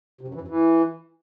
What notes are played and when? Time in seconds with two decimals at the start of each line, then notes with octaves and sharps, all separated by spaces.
0.21 C3
0.28 F#2
0.34 E3
0.41 F#2
0.48 E3